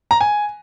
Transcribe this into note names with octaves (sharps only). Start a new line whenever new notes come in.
A#5
G#5